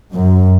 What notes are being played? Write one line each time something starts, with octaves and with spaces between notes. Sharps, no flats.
F#2